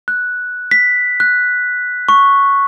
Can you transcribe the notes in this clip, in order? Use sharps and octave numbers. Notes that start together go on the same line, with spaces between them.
F#6
B6
F#6
C#6